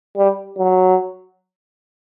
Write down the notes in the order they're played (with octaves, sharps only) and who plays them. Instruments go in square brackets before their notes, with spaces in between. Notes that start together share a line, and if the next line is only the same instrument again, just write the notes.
[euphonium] G3
F#3